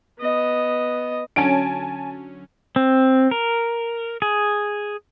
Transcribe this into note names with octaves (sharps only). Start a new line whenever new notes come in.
B3 D#5
D3 F#3 C#4 G#5 A5 D7
C4
A#4
G#4